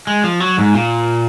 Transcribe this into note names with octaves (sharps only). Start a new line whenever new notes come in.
G#3
F3
F#3
G#2
A#2